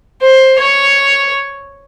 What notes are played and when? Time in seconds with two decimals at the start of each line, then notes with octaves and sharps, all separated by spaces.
0.22 C5
0.59 C#5